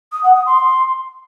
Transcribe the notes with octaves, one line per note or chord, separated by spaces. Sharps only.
D#6
F#5
D#6
C6